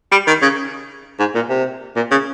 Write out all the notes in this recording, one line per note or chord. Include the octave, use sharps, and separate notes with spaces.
G3
D#3
C#3
G#2
A#2
C3
A#2
C#3